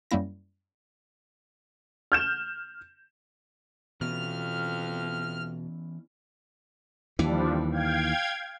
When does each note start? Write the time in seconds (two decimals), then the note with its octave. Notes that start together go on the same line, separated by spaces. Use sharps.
0.11 F#2 G3 A#3 E4 A#6
2.12 F6 G6 E7
4.01 F2 B2 E3 B3 C#4 F6
7.19 D#2 E3 F3 G3 D4
7.70 F5 G5 G#6